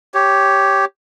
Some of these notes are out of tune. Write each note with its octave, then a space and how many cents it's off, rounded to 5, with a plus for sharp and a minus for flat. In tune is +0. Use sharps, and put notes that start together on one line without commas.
G4 +0 C#5 +0